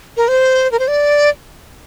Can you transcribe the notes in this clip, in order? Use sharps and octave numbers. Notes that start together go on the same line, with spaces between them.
A#4
C5
A#4
C5
D5